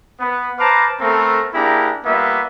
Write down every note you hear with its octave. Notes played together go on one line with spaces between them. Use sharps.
B3 B4
B4 C5 F5 A5 A#5 D6
A3 B3 C4 A4 A#4 A#5
A#3 D4 E4 G4 G#4 A#5
G3 A#3 B3 F4 E5